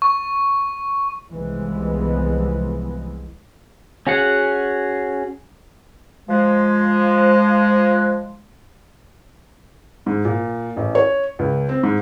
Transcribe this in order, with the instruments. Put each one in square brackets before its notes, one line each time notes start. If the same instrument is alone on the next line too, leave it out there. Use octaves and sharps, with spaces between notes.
[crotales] C#6
[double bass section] C2 E3 F3 G#3 B3
[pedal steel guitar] C#4 F#4 G#4 F#5
[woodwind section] F3 G#3
[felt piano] G#2
A#2
A1
C#5
C#2
C4
G#2